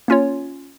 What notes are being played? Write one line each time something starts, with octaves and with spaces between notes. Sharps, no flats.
A#3 C#4 F4 C#5